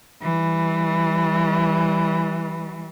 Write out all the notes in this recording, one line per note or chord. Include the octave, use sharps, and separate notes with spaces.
E3 G3